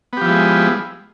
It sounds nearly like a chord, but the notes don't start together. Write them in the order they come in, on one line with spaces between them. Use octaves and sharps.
B3 G4 F3 E4 G#3